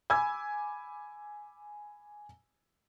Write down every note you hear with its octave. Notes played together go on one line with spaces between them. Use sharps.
G#5 B5 D6 E6 G#6